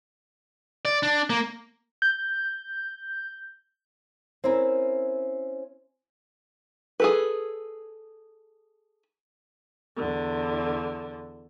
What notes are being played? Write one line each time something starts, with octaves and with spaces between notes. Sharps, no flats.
D5
D4
A#3
G6
C4 C#4 E4 A#4
G#4 A4 B4
E2 D3